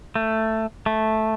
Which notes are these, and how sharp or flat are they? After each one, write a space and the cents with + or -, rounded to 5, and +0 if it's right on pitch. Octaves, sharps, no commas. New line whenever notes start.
A3 +10
A3 -5